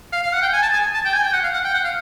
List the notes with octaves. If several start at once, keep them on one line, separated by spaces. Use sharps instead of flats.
F5
F5
F#5
G5
G#5
A5
G#5
A5
G5
G#5
G5
F#5
F5
F#5
G5
F#5
F5